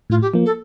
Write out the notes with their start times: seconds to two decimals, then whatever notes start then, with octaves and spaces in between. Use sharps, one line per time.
0.10 A2 F4
0.21 G4
0.34 F3 A#3
0.45 A4